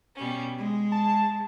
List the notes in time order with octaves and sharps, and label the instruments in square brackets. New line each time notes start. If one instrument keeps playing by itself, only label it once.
[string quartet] B2 G3 C#4
G#3
[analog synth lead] A5